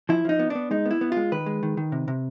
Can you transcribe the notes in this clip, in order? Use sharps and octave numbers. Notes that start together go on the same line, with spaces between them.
F3 E4
F3 D#4
B3
D4
B3
G#3 D#4
B3
E4
B3
G#3 F4
D#3 B4
G#3
D#3
D#3
C3
C3